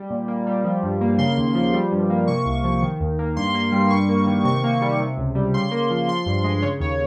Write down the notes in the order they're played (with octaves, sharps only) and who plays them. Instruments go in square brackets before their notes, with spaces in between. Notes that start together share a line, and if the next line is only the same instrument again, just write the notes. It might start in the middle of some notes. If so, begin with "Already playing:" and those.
Already playing: [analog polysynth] G3
A#2
A#3
G3
F3
G2
A#3
C#3 C6
D#2
F3
G3
G2
A#3
C3 C#6
C2
F3
D#3
D#2
A#3
G2 C6
A#3
G3
G2 C#6
A#3
D#3
C3 C#6
A#3
G3
C3
C#2
G3
C#3 C6
A#3
F3
F3 C6
G2
G#3
C#3 C#5
D#2 C#5